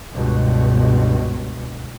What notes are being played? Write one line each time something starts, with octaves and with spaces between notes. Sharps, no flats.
C#2 G2 B2